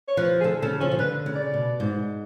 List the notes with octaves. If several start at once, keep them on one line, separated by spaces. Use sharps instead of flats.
C#5
F3 B4
G#4
D3 A4
C#3 A4
F3 C#4
F3
D3 B4
C#3
D5
B2
G#2